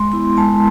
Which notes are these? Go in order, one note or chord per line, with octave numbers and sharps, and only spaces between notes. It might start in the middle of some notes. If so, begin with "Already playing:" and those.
Already playing: G#3 C6
B3 E4 C6
G#3 A5